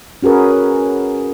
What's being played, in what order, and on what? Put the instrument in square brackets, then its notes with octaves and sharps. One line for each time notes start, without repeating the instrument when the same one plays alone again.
[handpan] C#4 F#4 G#4 A#4 B4